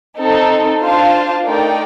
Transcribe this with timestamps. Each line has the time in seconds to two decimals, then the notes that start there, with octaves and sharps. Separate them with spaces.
0.18 C4 D#4 A4
0.82 D4 F4 C5 F5 A5
1.44 A3 D#4 A#4 D5 G5